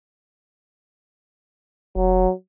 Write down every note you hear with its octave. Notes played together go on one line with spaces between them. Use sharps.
F1 F#3